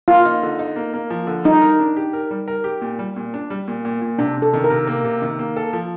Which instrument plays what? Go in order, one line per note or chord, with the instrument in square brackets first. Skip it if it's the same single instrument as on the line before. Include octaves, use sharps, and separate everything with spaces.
[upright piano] A#3 [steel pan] F4
[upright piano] D#4
D3
D#4
A#3
A#3
F3
D3
[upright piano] G3 [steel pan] D#4
[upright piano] A#4
D4
G4
A#4
G3
A#4
G4
A#2
G3
A#2
D4
G3
A#2
A#2
A#2
[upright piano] C3 [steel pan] D4
[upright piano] C3
[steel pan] A4
[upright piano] D#3
[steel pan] A#4
[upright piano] C3
A#3
C3
D#3
A#3
A4
F3